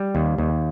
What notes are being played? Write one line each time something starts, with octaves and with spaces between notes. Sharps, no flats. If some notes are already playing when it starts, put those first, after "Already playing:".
Already playing: G3
D#2
D#2